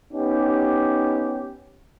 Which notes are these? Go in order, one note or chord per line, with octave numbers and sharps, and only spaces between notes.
B3 C#4 D#4 G4